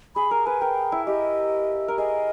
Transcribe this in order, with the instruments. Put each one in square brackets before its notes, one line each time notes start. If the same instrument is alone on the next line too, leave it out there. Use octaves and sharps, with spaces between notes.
[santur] G#4 [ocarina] B5
[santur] A#4 [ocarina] A#5
[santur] B4 [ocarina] G#5
[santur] A#4 [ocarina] G5
[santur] E4
[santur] G4 [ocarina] D#5
[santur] A#4
[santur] G#4 [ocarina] D#5